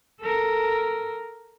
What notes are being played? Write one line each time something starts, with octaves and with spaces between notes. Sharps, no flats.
A4 A#4